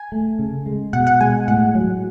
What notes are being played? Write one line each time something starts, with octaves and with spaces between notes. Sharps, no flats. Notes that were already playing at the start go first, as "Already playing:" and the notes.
Already playing: G#5
A3
C#3
G#3
B2 F#5
F#5
G#3 G#5
A2 F#5
F#3